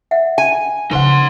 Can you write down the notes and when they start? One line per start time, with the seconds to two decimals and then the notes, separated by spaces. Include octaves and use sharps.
0.11 E5 F#5
0.38 G#5
0.91 C#3 F3 D#4 B4 C5 F#5 C6